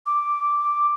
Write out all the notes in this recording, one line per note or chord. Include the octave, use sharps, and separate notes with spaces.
D6